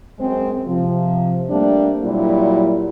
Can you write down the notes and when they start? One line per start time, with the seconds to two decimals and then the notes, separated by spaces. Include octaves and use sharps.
0.19 F#2 G#3 C4 C5
0.66 C3 F3
1.49 G3 A3 A#3 C4 D4
2.04 A#2 F#3 G3 E4